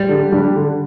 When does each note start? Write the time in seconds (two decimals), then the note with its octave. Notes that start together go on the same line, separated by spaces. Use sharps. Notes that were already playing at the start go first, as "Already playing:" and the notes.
Already playing: G3
0.09 D3
0.32 G3 D4
0.55 D3